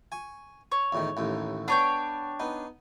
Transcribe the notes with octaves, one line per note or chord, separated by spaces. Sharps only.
G#5 C#6
C#5
E2 A2 D#3
A1 D#2 A2
B3 D4 C#5 G5
B3 D#4